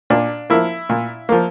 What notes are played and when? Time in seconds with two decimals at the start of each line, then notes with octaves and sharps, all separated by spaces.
0.10 A#2 D4
0.50 F3 A#3 E4
0.89 A#2
1.29 F3 A#3